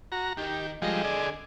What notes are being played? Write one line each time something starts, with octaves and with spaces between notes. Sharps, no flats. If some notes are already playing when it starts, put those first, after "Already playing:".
F#4 A#5
D#3 G4
D3 F3 G3 G#3 D#5
G#4 D5